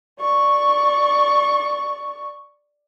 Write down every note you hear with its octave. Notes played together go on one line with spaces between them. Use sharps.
D5 C#6